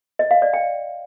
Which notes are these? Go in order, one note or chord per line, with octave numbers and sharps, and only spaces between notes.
D#5
F5
D5
G5